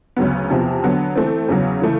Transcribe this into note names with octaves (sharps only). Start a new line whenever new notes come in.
D2 C#3 F#3 B3
E2 C3 F3
D3 F#3 B3
E3 A3 C4
E2 C#3 F#3
C#3 E3 A3